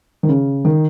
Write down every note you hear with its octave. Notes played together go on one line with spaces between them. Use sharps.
D#3
C#3
D#3